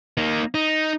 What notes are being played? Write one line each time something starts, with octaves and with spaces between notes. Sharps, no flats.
A#3 D#4
D#4